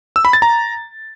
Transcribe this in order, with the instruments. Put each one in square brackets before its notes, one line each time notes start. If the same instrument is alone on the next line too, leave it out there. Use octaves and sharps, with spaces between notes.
[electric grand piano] E6
B5
A6
A#5